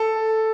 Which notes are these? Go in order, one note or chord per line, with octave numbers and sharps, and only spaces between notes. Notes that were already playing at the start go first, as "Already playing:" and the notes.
Already playing: A4